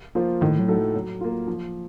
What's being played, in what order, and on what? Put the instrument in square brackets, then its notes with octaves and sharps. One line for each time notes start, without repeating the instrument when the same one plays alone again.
[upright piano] F3 A#3 F4 C5
[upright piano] A2 [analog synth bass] D#3
[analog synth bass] F#3
[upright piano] A3 D#4 F#4 A4
F#3
A#3 F4
F3